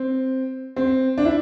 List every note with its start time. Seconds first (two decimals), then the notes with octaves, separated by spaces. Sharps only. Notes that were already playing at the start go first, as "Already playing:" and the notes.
Already playing: C4
0.76 C4
1.18 D4
1.25 E4